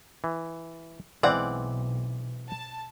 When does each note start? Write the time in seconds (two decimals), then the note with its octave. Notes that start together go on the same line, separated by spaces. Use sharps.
0.24 E3
1.23 B1 E3 G#3 C4 D5 F#5
2.49 A5